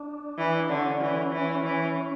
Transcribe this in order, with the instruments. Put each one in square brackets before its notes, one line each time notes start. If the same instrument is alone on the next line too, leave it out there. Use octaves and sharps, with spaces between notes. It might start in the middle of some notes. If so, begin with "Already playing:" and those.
Already playing: [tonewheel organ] D4
[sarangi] E3
[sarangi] D3 [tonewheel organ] C#4
[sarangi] E3
E3
E3